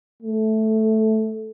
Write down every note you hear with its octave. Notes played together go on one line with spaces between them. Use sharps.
A3